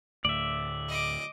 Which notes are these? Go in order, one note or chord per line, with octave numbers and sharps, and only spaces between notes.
D2 A2 D5 E5
D#5 D6